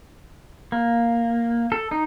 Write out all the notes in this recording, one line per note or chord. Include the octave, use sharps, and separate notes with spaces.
A#3
A4
D#4